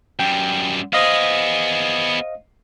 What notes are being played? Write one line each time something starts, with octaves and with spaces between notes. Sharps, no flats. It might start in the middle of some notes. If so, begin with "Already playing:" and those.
F#2 G3 G5
B3 G#4 C5 D#5 F5